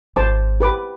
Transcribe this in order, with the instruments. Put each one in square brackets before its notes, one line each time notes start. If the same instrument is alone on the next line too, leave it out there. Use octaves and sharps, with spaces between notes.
[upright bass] G#1 [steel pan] C5 A5 D6
[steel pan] G4 B4 D6